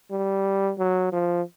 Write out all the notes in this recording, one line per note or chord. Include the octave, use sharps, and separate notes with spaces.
G3
F#3
F3